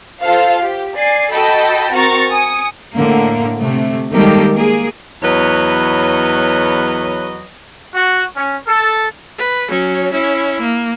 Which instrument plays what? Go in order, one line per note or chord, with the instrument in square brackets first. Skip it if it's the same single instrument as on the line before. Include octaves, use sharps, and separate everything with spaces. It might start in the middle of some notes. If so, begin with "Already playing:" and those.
[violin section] F4 A4 C5 F5
G4
D5 G#5 C7
F#4 A4 D#5 G5 A5 B5
C4 F#4 A#4 A#5 C#6 A6
G#5 D#6 C#7
[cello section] A2 D3 A#3
C3 A3
D#3 G3 G#3 A#3 G4 A4
A#3 G#4
[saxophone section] E2 F#3 B4 C#5 D#5
[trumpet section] F#4
C#4
A4
[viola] B4
F#3 C#4
C#4 E4
A#3